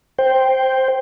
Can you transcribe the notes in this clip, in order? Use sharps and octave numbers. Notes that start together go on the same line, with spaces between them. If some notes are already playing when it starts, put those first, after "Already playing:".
C5 G5